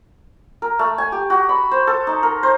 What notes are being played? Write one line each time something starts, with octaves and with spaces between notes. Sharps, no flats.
A#4
A3
G#5
G4
F#4
B5
C5
A4
D#4
A#4
C5